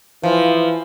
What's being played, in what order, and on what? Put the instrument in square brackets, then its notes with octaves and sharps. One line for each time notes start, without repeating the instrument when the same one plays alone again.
[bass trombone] E3 [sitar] F3